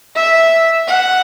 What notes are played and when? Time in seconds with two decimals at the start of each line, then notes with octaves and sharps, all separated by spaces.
0.16 E5
0.87 F#5